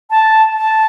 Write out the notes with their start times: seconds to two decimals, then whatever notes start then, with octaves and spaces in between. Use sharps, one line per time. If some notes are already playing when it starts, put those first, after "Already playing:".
0.10 A5
0.56 A5